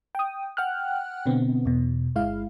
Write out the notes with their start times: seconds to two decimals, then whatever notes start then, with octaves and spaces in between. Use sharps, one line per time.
0.15 G5 D#6
0.57 F#5 G5 F6 F#6
1.26 B2 D3 B3 C4
1.65 E2 B2
2.15 G1 G#3 E4 F5